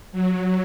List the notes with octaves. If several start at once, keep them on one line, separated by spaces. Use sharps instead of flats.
F#3